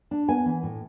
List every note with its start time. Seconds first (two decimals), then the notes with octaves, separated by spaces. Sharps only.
0.11 D4
0.28 B3 G#5
0.46 E3
0.63 A2